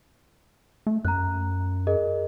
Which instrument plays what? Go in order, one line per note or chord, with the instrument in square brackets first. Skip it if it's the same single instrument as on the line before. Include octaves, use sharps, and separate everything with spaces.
[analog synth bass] A3
[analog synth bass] F#2 [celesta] A#5 F#6
[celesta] G#4 A#4 D#5